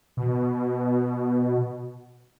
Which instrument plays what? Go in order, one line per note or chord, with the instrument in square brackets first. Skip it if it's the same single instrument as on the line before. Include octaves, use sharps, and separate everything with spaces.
[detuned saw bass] B2